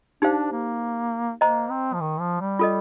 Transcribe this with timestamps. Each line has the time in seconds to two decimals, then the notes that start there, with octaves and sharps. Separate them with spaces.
0.22 D4 D#4 G4 C5 F5
0.52 A#3
1.41 A#3 C5 D#5 A#5
1.70 C4
1.94 F3
2.01 D#3
2.20 F3
2.41 G3
2.59 F4 A4 D#5